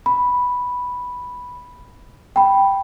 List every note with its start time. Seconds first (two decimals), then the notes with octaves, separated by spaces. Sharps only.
0.06 B5
2.36 G5 B5